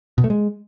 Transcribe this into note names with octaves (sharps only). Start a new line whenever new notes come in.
B2
A3
G#3